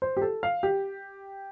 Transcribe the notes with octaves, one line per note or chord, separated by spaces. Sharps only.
C5
G4
A4
F5
G4